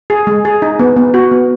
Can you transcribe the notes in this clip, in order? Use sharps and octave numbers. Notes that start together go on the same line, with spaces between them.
G#4
G#3
G#4
D#4
B3
B3
F#4
B3